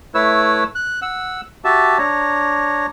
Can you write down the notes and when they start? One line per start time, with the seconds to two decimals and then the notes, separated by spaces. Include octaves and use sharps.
0.14 A3 E4 B4 C#5 E6
0.75 F#6
1.02 F#5 E6
1.64 F#4 G4 E5 A5
1.98 D4 C#5 A#5